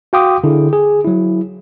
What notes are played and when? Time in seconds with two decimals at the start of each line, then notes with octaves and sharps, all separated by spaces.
0.13 F#4 F5 G5 C6 D6 D#6
0.44 D3 E4 G#4
0.73 G#4
1.05 F#3 E4